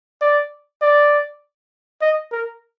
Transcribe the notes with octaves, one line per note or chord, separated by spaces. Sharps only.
D5
D5
D#5
A#4